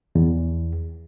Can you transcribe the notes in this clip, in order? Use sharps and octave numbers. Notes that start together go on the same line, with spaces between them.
E2